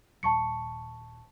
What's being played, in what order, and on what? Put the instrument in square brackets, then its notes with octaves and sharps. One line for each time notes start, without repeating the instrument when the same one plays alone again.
[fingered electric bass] D#1 [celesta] A5 C#6 C#7